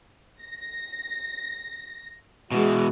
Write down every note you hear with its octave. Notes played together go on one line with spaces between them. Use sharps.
A#6
B2 E3 G#3 F#4